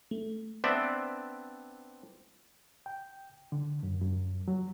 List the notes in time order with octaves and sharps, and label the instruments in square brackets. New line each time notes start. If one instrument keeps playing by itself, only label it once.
[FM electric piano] A3
[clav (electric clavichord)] B3 C4 D4 C5 D5 E5
[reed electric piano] G5
D3
F#2
F#2
F#3